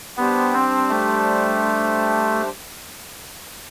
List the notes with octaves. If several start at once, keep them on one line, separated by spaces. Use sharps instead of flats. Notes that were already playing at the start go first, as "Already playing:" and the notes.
G3 B3 D4 G4 C5
C4
A3